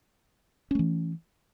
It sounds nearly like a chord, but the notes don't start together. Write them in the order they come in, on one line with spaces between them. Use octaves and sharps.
C#4 A3 E3